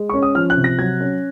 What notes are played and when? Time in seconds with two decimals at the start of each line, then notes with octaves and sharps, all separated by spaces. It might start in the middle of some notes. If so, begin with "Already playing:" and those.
Already playing: G#3
0.09 C#4 C#6
0.22 D#6
0.35 F3 F6
0.50 F#6
0.57 C3
0.64 A#6
0.78 F#3 G#6
1.01 C#4